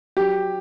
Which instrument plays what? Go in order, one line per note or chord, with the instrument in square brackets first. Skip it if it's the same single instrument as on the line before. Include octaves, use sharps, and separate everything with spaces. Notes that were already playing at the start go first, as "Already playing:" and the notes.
[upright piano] F#3 G4